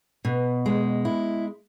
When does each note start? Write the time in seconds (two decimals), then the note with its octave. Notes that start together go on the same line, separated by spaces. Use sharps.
0.25 B2
0.66 G#3
1.05 E4